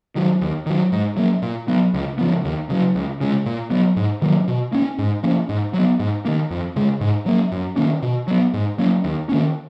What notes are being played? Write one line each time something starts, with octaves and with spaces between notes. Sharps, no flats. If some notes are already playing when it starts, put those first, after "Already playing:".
D#3 F#3
D#2
D#3 F#3
G#2
F#3 A#3
A#2
F#3 B3
C#2
C#3 F3 B3
D#2
C#3 F#3
C#2
C#3 G#3
A#2
F#3 B3
G#2
D#3 F#3 A#3
B2
A#3 C#4
G#2
F3 A#3 C#4
G#2
F#3
B3
G#2
D#3 A#3
F2
C#3 G#3
G#2
F#3 A#3
F#2
D#3 A#3 C#4
B2
F#3 B3
G#2
F#3 A#3 C#4
D#2
D#3 A#3 C#4